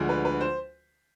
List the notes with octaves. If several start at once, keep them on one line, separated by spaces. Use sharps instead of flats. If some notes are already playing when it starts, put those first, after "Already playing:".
Already playing: D2 D3 F3 G#3
B4
B4
C5